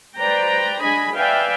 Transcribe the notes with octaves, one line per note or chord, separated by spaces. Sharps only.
B4 C5 D5 G5 A#5
D4 G#4 D#5 G#5 B5
B4 D5 E5 F5 G5 G#5